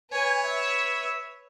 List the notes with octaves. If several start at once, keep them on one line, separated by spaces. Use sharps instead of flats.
B4 C#5 G#5
E5